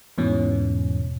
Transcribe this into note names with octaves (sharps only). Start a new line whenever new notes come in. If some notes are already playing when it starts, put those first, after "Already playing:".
E2 G#2 B2 E3 C#4